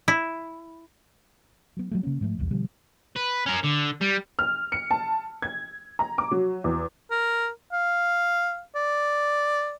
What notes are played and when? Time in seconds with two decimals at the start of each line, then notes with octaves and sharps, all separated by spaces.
0.08 E4
1.77 F#3 B3
1.91 F#3 G#3 A3
2.03 C#3 A#3 C#4
2.21 G#2 F3 A3
2.39 D#1 B1 E2 G3
2.51 B2 D3 F3 G3
3.16 B4
3.46 C#4 A#4
3.64 D3
4.01 G3
4.39 F6
4.72 C#7
4.91 A5
5.42 G#6
5.99 A#5
6.18 D6
6.31 F#3
6.64 E2
7.11 A#4
7.72 F5
8.75 D5